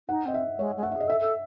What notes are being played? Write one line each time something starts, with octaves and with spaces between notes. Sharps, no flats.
D#4 F#5
C4 D#5
E5
G#3 C#5
G#3
A3 F#5
E5
G#4 D#5
A4 E5
A4